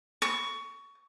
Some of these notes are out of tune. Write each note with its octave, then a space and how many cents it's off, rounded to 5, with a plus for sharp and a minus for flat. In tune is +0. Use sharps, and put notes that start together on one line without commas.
C#6 +20